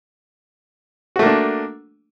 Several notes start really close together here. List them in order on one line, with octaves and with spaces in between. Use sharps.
F#4 A3 A#3 D4